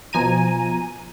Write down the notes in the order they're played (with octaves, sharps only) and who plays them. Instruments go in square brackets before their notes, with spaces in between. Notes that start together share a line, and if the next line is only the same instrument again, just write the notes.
[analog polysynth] B2 F3 G#5 A#5 D#7